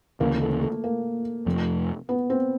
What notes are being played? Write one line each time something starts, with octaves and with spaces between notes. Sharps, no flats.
D2 C#3 E3 A#3
A3
A3
A#3
F2 C3 F3 A3
B3
C4